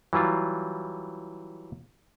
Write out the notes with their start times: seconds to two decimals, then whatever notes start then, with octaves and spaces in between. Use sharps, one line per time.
0.13 E3 F#3 G3 F4